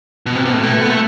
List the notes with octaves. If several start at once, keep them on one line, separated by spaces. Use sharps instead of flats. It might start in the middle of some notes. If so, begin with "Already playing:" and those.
B2
C3
B2
A2
B2
A3
B3
A3